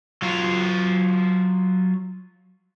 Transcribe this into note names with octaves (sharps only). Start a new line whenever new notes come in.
F#3 F4